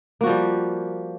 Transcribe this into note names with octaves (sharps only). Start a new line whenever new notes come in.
F3 G3 A#3 F#4